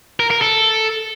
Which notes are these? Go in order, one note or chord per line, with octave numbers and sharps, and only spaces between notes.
A#4
A#4
A4